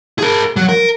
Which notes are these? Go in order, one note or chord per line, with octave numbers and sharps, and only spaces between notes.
G#4 A#4
F#3
A#4